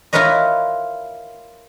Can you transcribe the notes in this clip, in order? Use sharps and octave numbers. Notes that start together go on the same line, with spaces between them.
E4 F4 A#4 B4 C#5 D#5